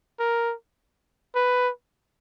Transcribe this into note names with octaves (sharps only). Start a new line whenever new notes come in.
A#4
B4